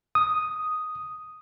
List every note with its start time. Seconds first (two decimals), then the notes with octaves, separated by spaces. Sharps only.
0.15 D#6